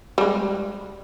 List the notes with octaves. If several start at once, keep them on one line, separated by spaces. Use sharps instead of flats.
G3 G#3